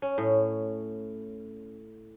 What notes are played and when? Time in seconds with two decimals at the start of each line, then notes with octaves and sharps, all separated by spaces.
0.02 C#4
0.18 A2